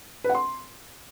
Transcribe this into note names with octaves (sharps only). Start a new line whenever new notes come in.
B4
F#5
C6